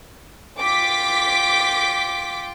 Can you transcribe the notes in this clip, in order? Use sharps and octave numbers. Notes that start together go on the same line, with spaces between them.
F4 G5 D6 B6